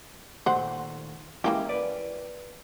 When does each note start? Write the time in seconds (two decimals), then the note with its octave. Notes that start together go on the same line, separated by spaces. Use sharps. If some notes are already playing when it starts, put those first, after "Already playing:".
0.46 A#2 D#3 A3 C5 F#5
1.44 E3 G#3 A#3 C#4 E4 G4
1.69 B4 D5